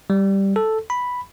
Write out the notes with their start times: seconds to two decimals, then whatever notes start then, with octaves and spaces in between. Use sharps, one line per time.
0.10 G3
0.56 A4
0.90 B5